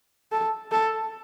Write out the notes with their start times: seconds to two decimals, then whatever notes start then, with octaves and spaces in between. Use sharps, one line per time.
0.32 A4
0.72 A4